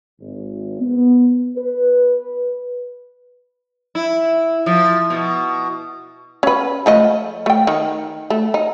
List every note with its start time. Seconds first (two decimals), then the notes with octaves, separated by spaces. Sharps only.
0.21 G#1
0.80 B3
1.56 B4
3.95 E4
4.66 F3
5.10 B2
6.43 C#4 B4
6.86 F3 A3 D#5
7.46 A3 G5
7.67 D#3
8.30 A3
8.54 D#4